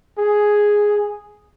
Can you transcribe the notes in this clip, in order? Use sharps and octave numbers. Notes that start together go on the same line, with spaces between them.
G#4